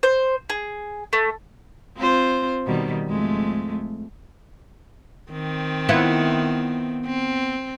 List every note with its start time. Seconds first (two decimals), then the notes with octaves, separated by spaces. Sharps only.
0.03 C5
0.50 G#4
1.13 A3
1.96 C4 F4 C5
2.66 B2 D#3 G3
3.07 F2 G#3 A3
5.31 D#3 C4
5.89 B3 E4 F4
7.06 C4